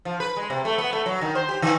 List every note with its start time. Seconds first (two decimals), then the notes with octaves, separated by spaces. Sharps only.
0.05 F3
0.20 B4
0.37 G#3
0.50 C3
0.65 A3
0.78 B3
0.93 A3
1.06 F#3
1.21 D#3
1.35 C5
1.49 G4
1.62 D#3